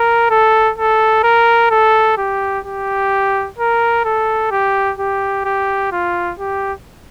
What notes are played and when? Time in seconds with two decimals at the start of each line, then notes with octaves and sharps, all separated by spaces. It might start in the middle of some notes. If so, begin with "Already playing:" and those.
Already playing: A#4
0.30 A4
0.78 A4
1.24 A#4
1.71 A4
2.17 G4
2.65 G4
3.59 A#4
4.05 A4
4.51 G4
4.99 G4
5.45 G4
5.92 F4
6.39 G4